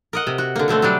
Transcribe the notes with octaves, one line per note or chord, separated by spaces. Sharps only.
A#4 D#5 F#5
C3
F#4
D3 A#3
B2 D3 A3 C4
F#3 G3 D4